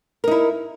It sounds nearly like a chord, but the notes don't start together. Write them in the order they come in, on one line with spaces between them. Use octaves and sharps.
A#4 D#4 E4